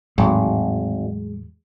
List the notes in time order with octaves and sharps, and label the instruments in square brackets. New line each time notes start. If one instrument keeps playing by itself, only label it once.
[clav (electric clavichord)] G#1 [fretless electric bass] E2 A2 F#3 [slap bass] G#3